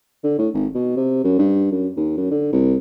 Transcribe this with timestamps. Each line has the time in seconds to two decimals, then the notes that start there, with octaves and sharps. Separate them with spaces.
0.23 D3
0.38 A2
0.54 G#1
0.74 B2
0.97 C3
1.24 F#2
1.38 G2
1.72 F#2
1.97 D#2
2.17 F#2
2.31 D3
2.52 C2